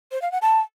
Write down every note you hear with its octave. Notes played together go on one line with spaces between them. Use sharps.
C5
F5
F#5
A5